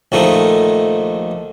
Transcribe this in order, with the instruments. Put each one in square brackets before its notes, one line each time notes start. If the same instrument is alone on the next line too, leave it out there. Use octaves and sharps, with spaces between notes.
[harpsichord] A#1 A#2 D#3 A3